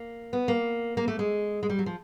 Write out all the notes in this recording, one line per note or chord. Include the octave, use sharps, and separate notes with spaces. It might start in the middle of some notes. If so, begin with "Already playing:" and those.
Already playing: A#3
B3
A#3
A#3
A3
G#3
G#3
G3
F#3
F3